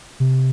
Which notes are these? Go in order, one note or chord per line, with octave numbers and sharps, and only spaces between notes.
C3